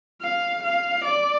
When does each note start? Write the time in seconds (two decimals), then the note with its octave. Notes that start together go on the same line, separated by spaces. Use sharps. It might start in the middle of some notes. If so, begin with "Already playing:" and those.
0.21 F5
0.63 F5
1.05 D5